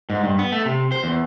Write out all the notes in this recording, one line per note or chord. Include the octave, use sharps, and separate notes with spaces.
G#2
G2
B3
A3
C3
C5
E2